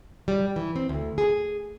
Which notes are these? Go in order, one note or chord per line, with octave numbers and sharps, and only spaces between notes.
G3
E3
C4
D2
G#4